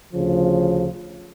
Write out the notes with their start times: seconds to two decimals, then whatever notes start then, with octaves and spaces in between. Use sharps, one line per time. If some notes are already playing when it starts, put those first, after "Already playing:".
0.13 D2 C#3 F3